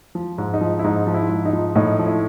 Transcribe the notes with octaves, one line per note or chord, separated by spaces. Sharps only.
F3
G#2
D#4
F3
E4
G#2 D#4
F3
E4
G#2
D#4
F3
A2 D#4
F3
E4